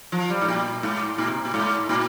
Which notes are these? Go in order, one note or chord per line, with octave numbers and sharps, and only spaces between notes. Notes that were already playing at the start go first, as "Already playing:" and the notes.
F3
G3
G#2
A#2
G#2
A#2
C3
A#2
G#2
A#2